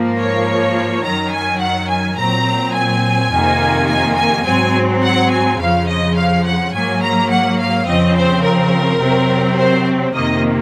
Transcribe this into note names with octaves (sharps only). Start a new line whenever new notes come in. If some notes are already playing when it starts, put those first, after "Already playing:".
Already playing: G#2 F3 A#3
C#5
F#2 D#3 F#3 A#5
G#5
F#5
G#5
A#2 F#3 C4 A#5
G#5
F2 C3 D#3 A#3
G#5
G#5
G#2 F#3 C4 G#5
F#5
G#5
F2 C#3 F3 F5
D#5
F5
F#5
G#2 F#3 A#3 G#5
A#5
F#5
F5
F2 C#3 F3 C4 D#5
C5
A#4
C3 F#3 C4
C5
F2 C3 D#3 A#3 D#5